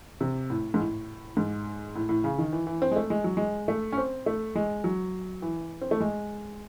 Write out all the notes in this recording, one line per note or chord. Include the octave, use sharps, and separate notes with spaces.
C3
A2
G#2
A2
G#2
A2
A2
C#3
D#3
E3
E3
C4
G#3
A3
G#3
F#3
G#3
A3
C#4
C4
A3
G#3
F#3
E3
C4
A3
G#3